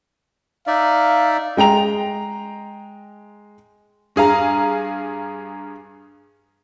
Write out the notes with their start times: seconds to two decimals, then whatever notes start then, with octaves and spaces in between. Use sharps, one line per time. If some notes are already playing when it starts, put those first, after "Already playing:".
0.67 D#4 D5 E5 F5
1.57 G#3 G5 A#5 F7
4.16 G2 G#4 F5 A#5